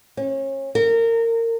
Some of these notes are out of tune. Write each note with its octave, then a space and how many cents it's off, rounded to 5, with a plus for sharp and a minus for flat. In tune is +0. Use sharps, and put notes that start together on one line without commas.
C#4 -30
A#4 -25